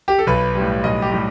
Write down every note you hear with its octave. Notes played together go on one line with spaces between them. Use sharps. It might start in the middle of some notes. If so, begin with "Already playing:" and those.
G4
A4
B1 B4
G3
A2
B1 D#5
G4
A2 G3